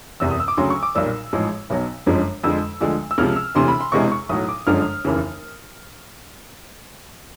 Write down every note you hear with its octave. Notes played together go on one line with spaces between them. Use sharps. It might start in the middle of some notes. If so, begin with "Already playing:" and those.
F#1 E2 C3 E6
D#6
E6
D6
D2 C#3 F#3 C6
C#6
D6
B1 A#2 G3 E6
A1 G#2 F3 G#3
B1 B2 F#3
G1 F#2 D3 F3 G#3
F2 D3 F3 G#3 E6
D2 D3 F3 G#3
E6
C#2 C3 F3 F6
E6
E1 D2 C3 E3 C6
B5
C6
E1 E2 C3 E3 G#3 C#6
C#6
B1 A2 F#3 D#6
D6
G1 F#2 D3 F3 G#3 F6
F1 D#2 C#3 E3